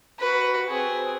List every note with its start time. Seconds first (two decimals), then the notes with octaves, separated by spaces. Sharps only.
0.20 F#4 B4
0.69 C4 G#4